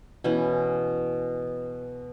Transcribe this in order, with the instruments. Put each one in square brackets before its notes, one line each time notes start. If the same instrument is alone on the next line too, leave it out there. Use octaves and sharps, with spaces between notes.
[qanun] B2 E3 C#4 B4